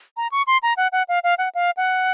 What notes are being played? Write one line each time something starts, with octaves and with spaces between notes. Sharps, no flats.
A#5
C#6
C6
A#5
F#5
F#5
F5
F5
F#5
F5
F#5